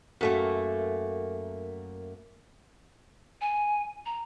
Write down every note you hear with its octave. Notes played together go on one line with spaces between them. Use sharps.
F#2 A3 A#3
G#5
A#5